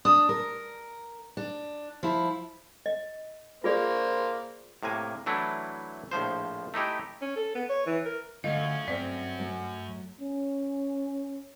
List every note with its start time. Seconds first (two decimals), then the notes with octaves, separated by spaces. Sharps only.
0.05 D4 D#6
0.29 A#4
1.37 D4
2.03 F3 E4
2.86 D#5
3.64 A#3 F4 G#4 C5 D5
4.83 A2 C3 A#3 G#5
5.26 E3 F#3 A3 D4 E4
6.11 A#1 A2 F3 C5
6.74 A3 D#4 E4 G4
7.22 C#4
7.36 A4
7.55 B3
7.69 C#5
7.86 E3
8.05 A#4
8.44 F#2 D3 A3 C#4 F4 D#5
8.88 G2 A3 C4 D5
9.39 F#3 A3
10.21 C#4